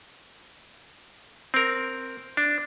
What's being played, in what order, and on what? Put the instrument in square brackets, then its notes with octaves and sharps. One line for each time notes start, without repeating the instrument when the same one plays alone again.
[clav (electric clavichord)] C4 A#4
D4